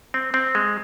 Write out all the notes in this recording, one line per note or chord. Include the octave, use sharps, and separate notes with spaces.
C4
C4
G#3